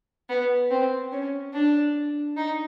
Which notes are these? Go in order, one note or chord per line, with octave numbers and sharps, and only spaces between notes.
B3
C4
C#4
D4
D#4